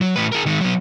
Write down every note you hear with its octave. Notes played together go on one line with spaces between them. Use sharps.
F#3
A2 B4
G#4 A#4
D#3 G#3
F#3 B3